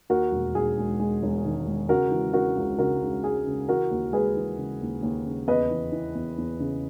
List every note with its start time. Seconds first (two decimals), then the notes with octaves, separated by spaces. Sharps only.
0.09 D#2 F#4 A#4
0.32 E1
0.55 E1 G#4
0.78 G#3
1.00 G#3
1.23 E1
1.45 D#3
1.67 G#3
1.89 C#3 F#4 A#4
2.11 E3
2.33 C#3 F#4 A#4
2.57 C#2
2.79 C#3 F#4 A#4
3.02 C#3
3.23 G#3 G#4
3.47 C#3
3.68 E3 F#4 A#4
3.91 D#2
4.13 G#3 G#4 B4
4.36 E3
4.58 C#3
4.81 D#2
5.02 D#2
5.26 C#3
5.47 E2 B4 D#5
5.71 E3
5.92 E3
6.15 E2
6.38 E2
6.60 C#3